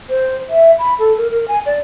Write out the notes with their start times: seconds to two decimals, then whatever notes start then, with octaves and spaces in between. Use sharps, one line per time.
0.10 C5
0.49 E5
0.79 B5
0.99 A4
1.17 A#4
1.30 A#4
1.48 G#5
1.66 D5